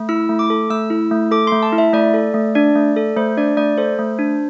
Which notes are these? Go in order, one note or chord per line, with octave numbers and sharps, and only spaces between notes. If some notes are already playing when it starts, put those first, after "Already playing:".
Already playing: A3
E4 E6
A3
D6
A4
A3 E6
E4
A3
A4 D6
A3 C6
A5
E4
E5
A3 D5
A4
A3
D4 D5
A3
A4
A3 C5
D4 D5
A3 D5
A4 C5
A3
D4